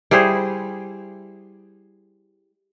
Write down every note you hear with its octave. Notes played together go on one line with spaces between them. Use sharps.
G3 E4 G#4 C5